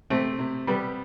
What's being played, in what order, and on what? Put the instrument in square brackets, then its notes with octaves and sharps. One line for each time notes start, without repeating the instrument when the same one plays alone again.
[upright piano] C3 [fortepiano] A3 C4
[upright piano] C3
[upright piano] C3 [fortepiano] G3 B3